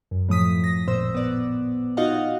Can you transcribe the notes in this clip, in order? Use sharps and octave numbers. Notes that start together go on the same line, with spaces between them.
F#2
A2 F3 D#6 B6
A#6
G#1 A#2 C5 E6
B3 D5
D#4 F4 F#4 D#5 F5 F#5